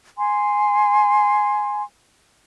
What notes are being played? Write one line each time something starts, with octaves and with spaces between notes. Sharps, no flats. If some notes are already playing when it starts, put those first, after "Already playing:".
G#5 C6